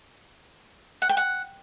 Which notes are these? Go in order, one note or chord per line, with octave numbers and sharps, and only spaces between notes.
F#5
G5
F#5